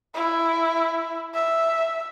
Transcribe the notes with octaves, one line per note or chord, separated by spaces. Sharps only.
E4
E5